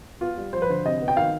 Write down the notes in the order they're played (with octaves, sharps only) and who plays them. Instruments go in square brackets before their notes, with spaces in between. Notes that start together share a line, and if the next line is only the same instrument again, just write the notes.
[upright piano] B3 F4
G3
F3 C5
B4
D3 C5
C3 D#5
B3
G5
D#3 F5